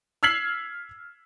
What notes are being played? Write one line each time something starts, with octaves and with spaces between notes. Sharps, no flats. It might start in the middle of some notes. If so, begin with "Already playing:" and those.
E6 F6 G#6 B6 C7 F#7